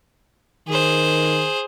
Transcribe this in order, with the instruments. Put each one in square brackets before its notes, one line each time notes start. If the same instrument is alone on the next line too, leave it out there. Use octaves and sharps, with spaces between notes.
[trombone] D#3 [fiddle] G#4 C5